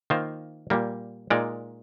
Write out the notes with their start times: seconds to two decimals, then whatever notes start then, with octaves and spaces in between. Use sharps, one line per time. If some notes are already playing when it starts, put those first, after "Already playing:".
0.10 D#3 A#3 F4 C5
0.70 A#2 G3 A#3
1.30 A#2 G#3 D#4 A#4 D5